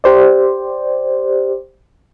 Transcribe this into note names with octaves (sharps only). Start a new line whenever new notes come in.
G4 C5 D5